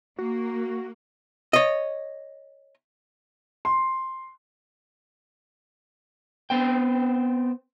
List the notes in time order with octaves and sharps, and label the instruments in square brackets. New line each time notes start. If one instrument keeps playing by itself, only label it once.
[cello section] A#3 [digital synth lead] F#4
[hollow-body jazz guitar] C#5 D#5
[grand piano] C6
[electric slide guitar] B3 C4 G5